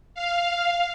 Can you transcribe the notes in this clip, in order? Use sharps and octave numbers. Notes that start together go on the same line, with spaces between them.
F5